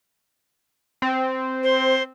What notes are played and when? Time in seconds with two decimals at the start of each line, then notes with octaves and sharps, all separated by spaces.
1.02 C4
1.63 C5